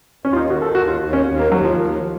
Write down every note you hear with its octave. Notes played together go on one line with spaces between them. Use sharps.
D#2 C#4
F4
D#4
D#3 F#4
A4
D#2 F#4
F4
D#2
C#4
D#2
A#3
D#2 F#3
F3
D#2